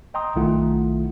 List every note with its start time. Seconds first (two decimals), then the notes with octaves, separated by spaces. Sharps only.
0.14 D#5 G5 A#5 C6 D#6
0.36 B1 D#3 A3 E4 F4 F#5